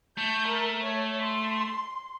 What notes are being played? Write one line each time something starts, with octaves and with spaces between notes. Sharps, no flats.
A3 G6
A#4
C#5
C6